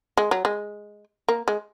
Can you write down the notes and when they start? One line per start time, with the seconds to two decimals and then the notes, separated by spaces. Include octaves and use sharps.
0.17 G#3
0.31 F#3
0.45 G#3
1.28 A#3
1.48 G#3